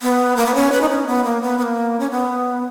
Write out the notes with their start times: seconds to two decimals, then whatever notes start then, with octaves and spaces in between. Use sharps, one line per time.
0.02 B3
0.36 A#3
0.46 B3
0.55 C#4
0.72 B4
0.81 D#4
0.89 C#4
1.07 B3
1.24 A#3
1.42 B3
1.58 B3
1.63 A#3
2.00 C#4
2.11 B3